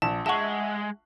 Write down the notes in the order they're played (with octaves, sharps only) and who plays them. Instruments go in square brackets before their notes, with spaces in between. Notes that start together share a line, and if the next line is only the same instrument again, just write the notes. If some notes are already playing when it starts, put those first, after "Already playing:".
[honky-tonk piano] A#1 [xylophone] A5
[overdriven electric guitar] G#3 [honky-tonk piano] E5 F#5 [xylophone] A5 C#6